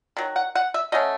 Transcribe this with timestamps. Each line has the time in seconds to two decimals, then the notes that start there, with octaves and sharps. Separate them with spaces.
0.17 D#3 F#3
0.36 F#5
0.55 F#5
0.74 E5
0.92 F#3 A3 C#4 D#5